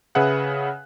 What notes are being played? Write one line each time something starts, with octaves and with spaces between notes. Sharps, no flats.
C#3 G#4 B4 E5 F#5 F#6